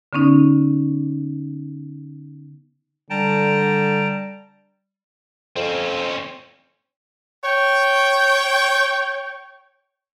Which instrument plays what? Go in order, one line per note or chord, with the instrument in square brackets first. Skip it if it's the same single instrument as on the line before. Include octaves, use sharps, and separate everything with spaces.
[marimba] D3 B3 C#4 D#4
[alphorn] D3 [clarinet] G3 [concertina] G5 A5 A#5
[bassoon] F2 [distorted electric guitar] C4 C#4
[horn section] C#5 G5